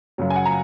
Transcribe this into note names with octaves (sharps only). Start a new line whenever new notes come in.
F#2 C#3 F#3
G#5
F#5
A#5